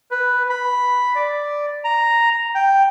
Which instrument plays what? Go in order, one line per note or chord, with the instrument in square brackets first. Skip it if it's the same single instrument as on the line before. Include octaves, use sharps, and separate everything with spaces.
[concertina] B4
B5
D5
A#5
G5